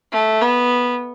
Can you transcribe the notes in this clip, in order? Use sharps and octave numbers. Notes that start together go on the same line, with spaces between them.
A3
B3